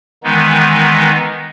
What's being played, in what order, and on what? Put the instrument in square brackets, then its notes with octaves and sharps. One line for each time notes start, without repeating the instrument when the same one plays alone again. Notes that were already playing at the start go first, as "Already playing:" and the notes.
[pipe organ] D#3 E3 G#3 B3 D#4